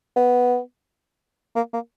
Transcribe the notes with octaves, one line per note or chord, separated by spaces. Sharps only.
B3
A#3
A#3